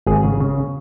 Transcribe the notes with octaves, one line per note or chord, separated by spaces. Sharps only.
G#1 G#4
C#3
C#3